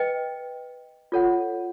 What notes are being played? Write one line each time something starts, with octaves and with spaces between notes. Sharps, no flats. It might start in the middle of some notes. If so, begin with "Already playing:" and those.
Already playing: B4 D#5 G5
F4 A4 C#5 F#5